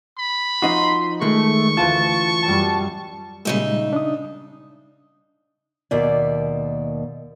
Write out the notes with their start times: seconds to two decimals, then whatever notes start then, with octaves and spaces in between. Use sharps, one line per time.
0.18 B5
0.62 F3 D#4 F#4 C6
1.21 D#3 G#3 A3 C#6
1.77 D2 E3 F4 A5
2.42 F#2 G3 A5
3.45 A#2 C#3 G3 G#3 D#4 E5
3.93 D4 D#6
5.91 D#2 B2 D5